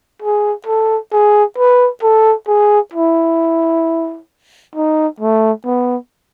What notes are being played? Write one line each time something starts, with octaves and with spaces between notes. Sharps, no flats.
G#4
A4
G#4
B4
A4
G#4
E4
D#4
A3
B3